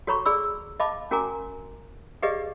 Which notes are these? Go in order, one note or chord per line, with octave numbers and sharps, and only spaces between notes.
F#4 A4 C#5 A#5 B5 C#6
G#4 D5 B5 E6
D#5 F5 A5 B5 D6
C#4 F#4 A#4 G#5 A#5 D6
G4 G#4 B4 D5 D#5 F5